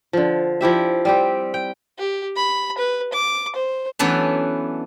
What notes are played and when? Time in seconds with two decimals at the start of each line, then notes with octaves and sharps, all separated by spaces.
0.13 D3 F3
0.61 F3 E4 G4 E5
1.05 G3 C4 G4
1.54 G5
1.98 G4
2.37 B5
2.78 B4
3.13 D6
3.56 C5
3.99 E3 F#3 A3 B3 C#4 D4